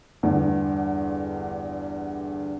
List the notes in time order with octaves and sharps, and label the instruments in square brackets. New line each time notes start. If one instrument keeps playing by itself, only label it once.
[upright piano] E2 G2 D3